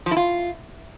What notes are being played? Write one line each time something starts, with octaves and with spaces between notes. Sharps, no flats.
F3
E4
F4